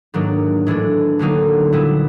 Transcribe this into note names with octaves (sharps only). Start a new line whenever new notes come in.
G#2 D#3 F#3 A#3 D4
A2 E3 A3 D4
D2 D3 F#3 A#3 D#4
A#2 G3 B3 E4